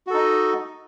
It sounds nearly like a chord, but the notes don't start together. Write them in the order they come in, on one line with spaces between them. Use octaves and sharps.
F#4 A4 D#4 D#5